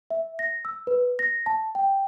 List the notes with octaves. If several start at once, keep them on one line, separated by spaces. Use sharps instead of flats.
E5
A#6
E6
B4
A#6
A5
G5